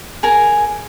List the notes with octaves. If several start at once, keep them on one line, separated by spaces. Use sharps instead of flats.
G#4 A#4 G#5